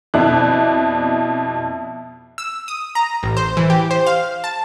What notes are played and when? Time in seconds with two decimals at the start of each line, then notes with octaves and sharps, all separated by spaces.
0.14 F2 B2 E4 D5 F#6
2.38 E6
2.68 D#6
2.95 A#5
3.23 A1
3.37 C5
3.57 E3
3.70 G4
3.91 C5
4.06 F5
4.44 A5